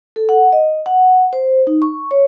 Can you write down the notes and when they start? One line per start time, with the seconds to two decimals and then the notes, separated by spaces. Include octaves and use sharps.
0.16 A4
0.29 F#5
0.52 D#5
0.86 F#5
1.33 C5
1.67 D#4
1.82 C#6
2.11 C#5